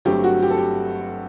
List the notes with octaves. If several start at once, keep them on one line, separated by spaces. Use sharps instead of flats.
G1 G2 F#3 A3 C4 G4
F#4
G4
A4
G4